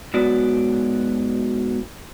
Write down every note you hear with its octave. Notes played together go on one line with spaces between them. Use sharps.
G#2 F#3 B3 F#4 D5